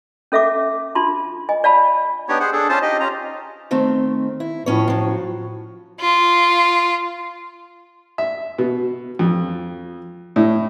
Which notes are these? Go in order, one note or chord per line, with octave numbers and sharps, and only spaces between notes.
C#4 A4 E5 F5 D6
D4 F4 A5 C6
D#5 G#5
D5 F5 A5 B5
B3 D4 D#4 G4 C#5
G#4 C5 F#5
D4 G#4 A4
C#4 F4 C5 A5
D#4 G4 D#5
C#4 F4 A#5
D#3 A3 C4
E4
A2 F3 C#4 C#5
F3 F#3
F4
E5
B2
F2
A2